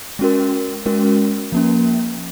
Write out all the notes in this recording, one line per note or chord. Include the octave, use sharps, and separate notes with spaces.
G#3 C#4 F#4 A#4
G#3 C#4 F#4 A#4
F3 A#3 C#4